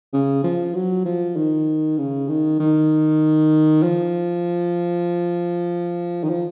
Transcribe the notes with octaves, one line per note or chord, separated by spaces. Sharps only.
C#3
F3
F#3
F3
D#3
C#3
D#3
D#3
F3
D#3
F3